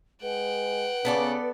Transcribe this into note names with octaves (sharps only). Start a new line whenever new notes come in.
G#3 B4 F#5 G5
C#3 B3 A4 D5